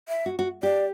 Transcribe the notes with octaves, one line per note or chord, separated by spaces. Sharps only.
E5
F#4
F#4
G4 D5